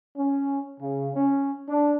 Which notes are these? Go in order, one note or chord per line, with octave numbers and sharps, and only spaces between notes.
C#4
C#3
C#4
D4